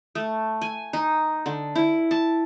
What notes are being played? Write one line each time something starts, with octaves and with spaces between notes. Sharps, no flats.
A3
G#5
D#4
D3
E4
A5